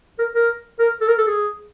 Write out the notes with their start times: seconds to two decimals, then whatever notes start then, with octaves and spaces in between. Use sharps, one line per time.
0.19 A#4
0.35 A#4
0.79 A#4
1.01 A4
1.08 A#4
1.18 A4
1.27 G#4